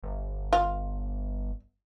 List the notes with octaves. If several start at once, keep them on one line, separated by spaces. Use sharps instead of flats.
G1
F4